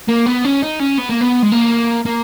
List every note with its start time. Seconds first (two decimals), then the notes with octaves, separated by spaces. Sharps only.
0.09 A#3
0.26 B3
0.44 C#4
0.62 D#4
0.80 C#4
0.98 B3
1.09 A#3
1.21 B3
1.42 G#3
1.52 A#3
2.06 A#3